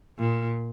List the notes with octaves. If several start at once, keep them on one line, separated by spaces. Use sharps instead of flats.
A#2